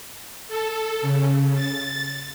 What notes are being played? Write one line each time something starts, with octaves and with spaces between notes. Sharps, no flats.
A4
C#3
A6